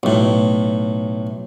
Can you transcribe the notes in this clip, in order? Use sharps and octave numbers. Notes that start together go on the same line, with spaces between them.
B1 A2